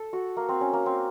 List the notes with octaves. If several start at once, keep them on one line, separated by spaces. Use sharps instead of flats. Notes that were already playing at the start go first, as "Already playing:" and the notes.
Already playing: A4
F#4
A#3
C4
C#4
A#3
C4